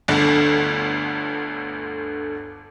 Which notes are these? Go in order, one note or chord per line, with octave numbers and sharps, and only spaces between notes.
G1 D2 D3